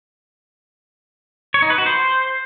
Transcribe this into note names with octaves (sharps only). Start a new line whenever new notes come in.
C#5
D#4
B4
F#4
C5